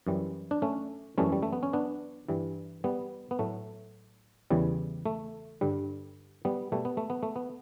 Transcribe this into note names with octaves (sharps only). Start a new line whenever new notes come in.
F#2 E3 G3
D4
A3 C#4
F#2 E3 G3 A3 C#4
G3
A3
B3
C#4
B3 D4
G2 E3 G3
G3 B3
B3
A2 F#3 A3
E2 C#3 E3 G3
A3
G2 D3 G3
G3 B3
B2 G3 A3
B3
A3
B3
A3
B3